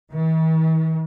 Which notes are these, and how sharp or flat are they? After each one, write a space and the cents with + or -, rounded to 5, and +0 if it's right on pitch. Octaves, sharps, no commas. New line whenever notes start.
E3 -45